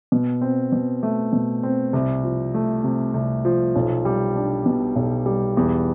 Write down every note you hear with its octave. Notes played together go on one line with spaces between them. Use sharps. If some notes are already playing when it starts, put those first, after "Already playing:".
B2
C4
B2
A3
B2
C4
C2
F3
A3
C3
C2
F3
B1
G3
D4
B2
B1
G3
E2